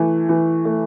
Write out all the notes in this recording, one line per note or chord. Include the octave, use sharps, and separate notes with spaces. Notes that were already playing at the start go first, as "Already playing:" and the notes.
Already playing: E3 A3
E3
A3